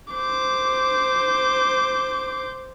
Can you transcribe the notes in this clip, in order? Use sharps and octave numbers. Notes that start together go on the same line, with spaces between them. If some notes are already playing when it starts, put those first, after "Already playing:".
C5 D6